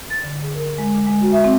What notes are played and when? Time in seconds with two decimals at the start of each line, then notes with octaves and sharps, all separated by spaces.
0.10 A6
0.23 D3
0.43 G#4
0.55 A#4
0.78 G#3
0.94 D6
1.07 G#3
1.21 F#4
1.32 E5
1.44 C4